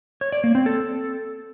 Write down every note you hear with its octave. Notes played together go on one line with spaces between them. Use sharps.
C#5
D5
A#3
C4
A4